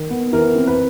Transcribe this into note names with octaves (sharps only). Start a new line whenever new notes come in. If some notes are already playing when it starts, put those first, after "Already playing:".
Already playing: D#3
B3
E3 A#4
C4
B4